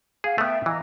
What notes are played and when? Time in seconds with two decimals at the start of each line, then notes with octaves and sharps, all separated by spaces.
0.24 G#4 F5 F#5
0.38 A3 B3 E5 G5
0.66 E3 D#5 F5 A#5